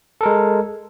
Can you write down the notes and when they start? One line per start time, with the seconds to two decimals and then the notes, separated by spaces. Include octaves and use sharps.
0.21 A4
0.23 A#4
0.26 G#3